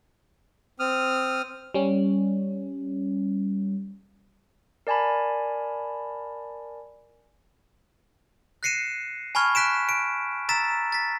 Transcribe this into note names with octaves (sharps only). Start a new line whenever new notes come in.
C4 D#6 F6
G3 C#4
A#4 D5 G#5 A5 B5
F#6 A#6 C7 C#7 D#7 E7
G#5 A5 B5 C#6 F6 G#6
F#6 B6 D7 E7
D7
A#5 E6 A6 B6 E7
A6 B6